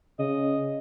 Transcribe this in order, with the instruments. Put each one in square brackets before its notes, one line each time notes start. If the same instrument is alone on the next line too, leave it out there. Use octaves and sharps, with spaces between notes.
[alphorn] C#3 [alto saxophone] D#5